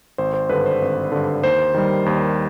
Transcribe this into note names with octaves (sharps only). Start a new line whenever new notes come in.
G#1 C5
C5
G2 D3 B4
C5
G#1
G2 D3
D#2 C5
D#3 G3
D#2